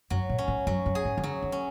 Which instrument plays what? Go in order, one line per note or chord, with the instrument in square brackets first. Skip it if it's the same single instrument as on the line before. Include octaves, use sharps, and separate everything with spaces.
[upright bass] F#2 [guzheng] F#3
[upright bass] A#2
[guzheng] C#4
[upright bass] G#2
[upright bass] F#2 [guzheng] F#3
[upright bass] F#2
[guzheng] G#4
[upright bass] G#2
D#3
[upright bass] C#3 [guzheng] F#3
[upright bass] D#3
[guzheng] C#4